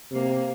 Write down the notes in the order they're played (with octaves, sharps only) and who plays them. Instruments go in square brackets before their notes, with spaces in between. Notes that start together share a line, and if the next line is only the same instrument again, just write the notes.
[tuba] C3 [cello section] A#3